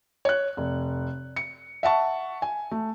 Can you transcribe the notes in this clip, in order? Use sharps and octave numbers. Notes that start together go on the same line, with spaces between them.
C#5 F#6
F1
C#7
E5 F#5 A5 C#6
G#5
A3